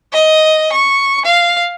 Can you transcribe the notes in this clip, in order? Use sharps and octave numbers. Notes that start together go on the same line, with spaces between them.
D#5
C#6
F5